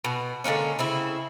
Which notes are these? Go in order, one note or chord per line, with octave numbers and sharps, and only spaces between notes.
B2
D3 G#3 A#3 C#4
C#3 C4 E4